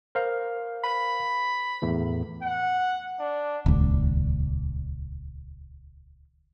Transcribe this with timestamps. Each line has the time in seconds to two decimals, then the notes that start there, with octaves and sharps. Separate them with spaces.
0.15 A#4 C5 F5
0.84 B5
1.82 E2 A2 E3
2.43 F#5
3.19 D4
3.66 D#1 C#2